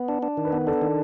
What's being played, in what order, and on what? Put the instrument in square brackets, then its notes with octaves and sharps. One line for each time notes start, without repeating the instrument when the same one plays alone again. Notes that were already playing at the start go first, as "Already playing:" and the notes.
Already playing: [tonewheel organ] B3
D4
D4
D#3
[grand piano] B4
[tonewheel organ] B3
[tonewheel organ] D4 [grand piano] A4
[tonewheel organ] D#3